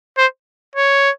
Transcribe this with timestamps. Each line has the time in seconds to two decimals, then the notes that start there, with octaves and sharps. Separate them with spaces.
0.18 C5
0.76 C#5